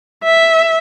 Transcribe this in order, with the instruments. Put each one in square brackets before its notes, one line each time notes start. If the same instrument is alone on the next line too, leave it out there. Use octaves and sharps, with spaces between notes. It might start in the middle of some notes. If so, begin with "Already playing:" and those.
[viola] E5